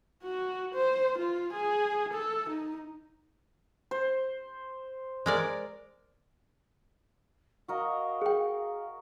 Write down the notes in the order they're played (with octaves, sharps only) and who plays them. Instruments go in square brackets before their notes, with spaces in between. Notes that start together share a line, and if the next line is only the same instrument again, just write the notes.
[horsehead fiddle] F#4
C5
F4
G#4
A4
D#4
[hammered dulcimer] C5
[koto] G#3 A#4 D5
[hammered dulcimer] F#4 A#4 D#5 [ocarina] F5
[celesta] G#4 G5